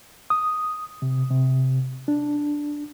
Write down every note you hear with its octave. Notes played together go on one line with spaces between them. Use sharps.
D#6
C3
C3
D4